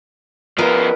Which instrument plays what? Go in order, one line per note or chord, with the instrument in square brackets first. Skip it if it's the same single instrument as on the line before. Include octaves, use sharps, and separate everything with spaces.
[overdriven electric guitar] F3 B3 [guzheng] A#4 B4 D#5